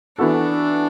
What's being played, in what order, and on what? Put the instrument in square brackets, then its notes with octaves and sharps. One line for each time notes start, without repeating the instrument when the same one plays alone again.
[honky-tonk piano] E3 B3 F#4 A4 [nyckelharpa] D4